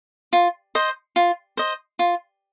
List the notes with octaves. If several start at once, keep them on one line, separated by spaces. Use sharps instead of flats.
F4
C5 D#5
F4
C5 D#5
F4